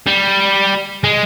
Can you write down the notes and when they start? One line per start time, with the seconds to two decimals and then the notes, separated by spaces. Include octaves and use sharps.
0.07 G3
1.04 G#3